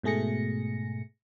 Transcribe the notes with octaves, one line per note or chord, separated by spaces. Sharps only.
G#2 B2 A3 G#4 A#6 C#7